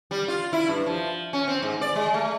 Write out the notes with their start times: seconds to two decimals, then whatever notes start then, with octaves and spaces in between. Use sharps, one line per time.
0.11 G3
0.28 F4
0.53 E4
0.68 G2
0.86 F3
1.33 C#4
1.48 C4
1.62 G#2
1.81 D5
1.95 G#3
2.14 A3